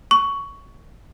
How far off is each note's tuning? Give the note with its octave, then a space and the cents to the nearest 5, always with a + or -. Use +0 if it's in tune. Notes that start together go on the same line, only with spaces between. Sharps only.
C#6 +15